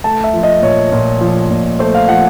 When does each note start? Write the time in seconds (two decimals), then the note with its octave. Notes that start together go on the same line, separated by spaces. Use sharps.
0.04 A3 A5
0.24 E5
0.33 F3
0.43 D#5
0.62 A#2 C#5
0.92 A#2
1.21 F3
1.50 A#2
1.79 A3 C5
1.95 F5
2.08 F3 F#5